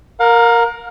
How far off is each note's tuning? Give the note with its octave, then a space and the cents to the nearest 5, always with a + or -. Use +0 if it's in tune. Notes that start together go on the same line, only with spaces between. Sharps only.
A#4 +0 F5 +40